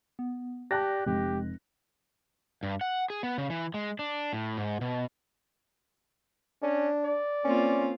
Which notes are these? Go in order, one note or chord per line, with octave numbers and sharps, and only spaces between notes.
B3
G4 D5 A5 F#6 A#6
F1 G#3 G4
G2
F#5
G#4
B3
C#3
E3
G#3
D4
A2
G#2
B2
C#4 D4
D5
A#3 C4 C#4 F4